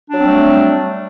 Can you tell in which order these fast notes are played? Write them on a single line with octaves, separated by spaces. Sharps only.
D4 F#3 C4 G3 A3